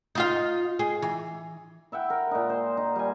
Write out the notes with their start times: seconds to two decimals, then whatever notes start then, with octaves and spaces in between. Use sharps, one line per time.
0.15 D#4 F4 F5
0.79 G#4
1.02 E3
1.92 E4 E5 F#5 G5
2.10 A#4
2.31 A#2 D#4
2.50 C5
2.77 D#4
2.96 G3 G#5